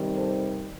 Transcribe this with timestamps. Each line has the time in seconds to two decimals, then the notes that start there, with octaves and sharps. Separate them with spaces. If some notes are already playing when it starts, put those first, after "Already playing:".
Already playing: C3 D#3 G3 C4
0.16 A4 C5